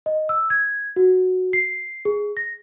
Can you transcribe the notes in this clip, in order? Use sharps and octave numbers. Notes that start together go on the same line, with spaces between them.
D#5
E6
G#6
F#4
C7
G#4
A#6